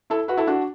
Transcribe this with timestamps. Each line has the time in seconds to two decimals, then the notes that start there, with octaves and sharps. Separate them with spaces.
0.10 E4 A4
0.28 F#4 B4
0.37 E4 A4
0.47 D4 F#4